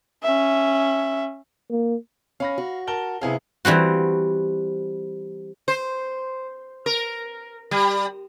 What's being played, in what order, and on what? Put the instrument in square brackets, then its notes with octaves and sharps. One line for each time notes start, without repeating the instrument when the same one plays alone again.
[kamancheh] C#4 E5
[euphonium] A#3
[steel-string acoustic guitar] C#4 [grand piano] F5 B5 A#6
[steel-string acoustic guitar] F#4
[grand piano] A#4 A5 G7
[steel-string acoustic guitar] F2 C3 E4 [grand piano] B3 G#4 F5
[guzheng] E3 G3 C4 F#4
[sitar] C5
A#4
G3